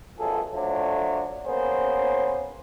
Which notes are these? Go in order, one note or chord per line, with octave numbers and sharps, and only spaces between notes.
B1 F#2 F3 G#4 A4
F3 F#3 A3 D4
A#3 B3 C#4 G#4 C5